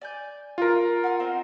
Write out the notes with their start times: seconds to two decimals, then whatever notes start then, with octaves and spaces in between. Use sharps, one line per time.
0.01 D5 G#5 G6
0.58 F4 A#4
1.04 F#5 G#5 F6
1.20 C4 D#4 C5